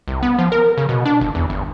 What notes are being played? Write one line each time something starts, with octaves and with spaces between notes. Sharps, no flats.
C2
B3
F3
A#4
C#3
B2
D4
G1
E2
G1